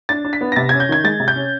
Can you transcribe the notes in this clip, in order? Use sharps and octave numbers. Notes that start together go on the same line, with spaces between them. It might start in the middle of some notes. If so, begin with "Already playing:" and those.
D4 A6
D4
B6
B3
A#6
C3 A6
C#4 G#6
G6
D#3 G#6
G#3 A6
C3
G6
C#4